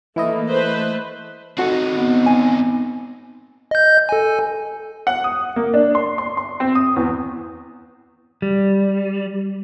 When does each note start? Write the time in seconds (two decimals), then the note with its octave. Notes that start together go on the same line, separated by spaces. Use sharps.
0.16 E3 A3 A#3 E4 D#5
0.49 A3 B4 C5
1.58 C4 D#4 F#4 A4 F#5
1.97 B3
2.26 G#5
3.71 D#5 G6
4.09 A4 G#5
5.07 F#5
5.24 D#6
5.56 A#3
5.74 D4
5.95 C6
6.18 C6
6.37 C6
6.60 C4
6.75 D#6
6.96 E2
8.42 G3